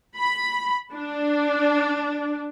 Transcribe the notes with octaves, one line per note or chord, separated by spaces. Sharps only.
B5
D4